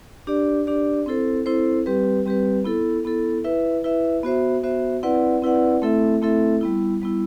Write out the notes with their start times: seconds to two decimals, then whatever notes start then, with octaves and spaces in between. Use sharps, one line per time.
0.27 D4 G4 D5
0.67 D4 G4 D5
1.06 C4 E4 A4 C5
1.46 C4 E4 A4 C5
1.86 G3 C4 G4 B4
2.26 G3 C4 G4 B4
2.64 B3 E4 A4
3.05 B3 E4 A4
3.44 E4 B4 E5
3.84 E4 B4 E5
4.23 B3 F#4 C5 E5
4.63 B3 F#4 C5 E5
5.03 C4 E4 B4 D5 F#5
5.42 C4 E4 B4 D5 F#5
5.82 A3 C4 E4 A4 E5
6.22 A3 C4 E4 A4 E5
6.61 G3 B3 E4
7.02 G3 B3 E4